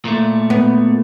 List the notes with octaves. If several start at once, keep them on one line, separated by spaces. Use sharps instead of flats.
A#2 A3
B3